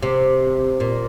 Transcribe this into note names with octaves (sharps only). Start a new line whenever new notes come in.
C3
A#2